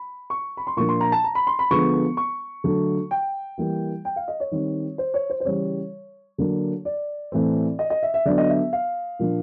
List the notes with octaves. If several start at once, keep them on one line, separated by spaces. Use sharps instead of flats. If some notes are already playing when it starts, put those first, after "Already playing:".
Already playing: B5
C#6
B5
C6
A#2 F3 A#3 D4 C#6
C6
A#5
A5
A#5
B5
C6
B5
D3 F3 G#3 B3 C#6
C#6
D3 F#3 A3
G5
E3 G3 A#3
G5
F5
D#5
C#5
D#3 G3 C4 D#4
C5
C#5
C5
C5
C#3 E3 G3 C#5
D3 F#3 A#3 D4
D5
A2 E3 A3 C4
D#5
D#5
E5
E5
D3 F#3 B3 D4 D5
D#5
E5
F5
A#2 F3 A#3 D4